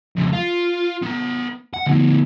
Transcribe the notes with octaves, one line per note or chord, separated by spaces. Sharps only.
F2 C#3
F4
B3 A#5
F#5
D2 B3